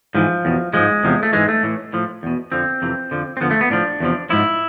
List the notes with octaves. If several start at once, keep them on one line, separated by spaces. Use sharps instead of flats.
G#2 E3 F3
E2 B2
G#2 F3 G#3
E2 C3 F3
A3
G#2 E3 G#3
A3
A2 E3
A2 F3
E2 B2
F2 D3 F3 C4
F2 C3 E3
F2 D3 F3
C4
F2 D3 F3 B3
A3
B3
A2 F3 D4
E2 C3 F3
G#2 F3 E4